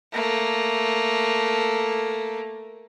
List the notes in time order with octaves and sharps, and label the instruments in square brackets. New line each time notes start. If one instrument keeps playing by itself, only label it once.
[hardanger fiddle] A3 A#3